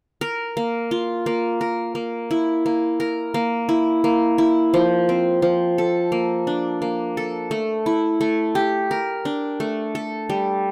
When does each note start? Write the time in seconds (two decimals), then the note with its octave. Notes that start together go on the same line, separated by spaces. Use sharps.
0.21 A#4
0.57 A#3
0.91 F4
1.26 A#3
1.61 A#4
1.95 A#3
2.31 E4
2.66 A#3
3.00 A#4
3.34 A#3
3.69 E4
4.04 A#3
4.38 E4
4.74 F3
5.09 C4
5.42 F3
5.78 A4
6.12 A#3
6.47 D4
6.82 A#3
7.17 A4
7.51 A3
7.86 E4
8.21 A3
8.55 G4
8.91 A#4
9.25 D4
9.60 A3
9.95 A4
10.30 G3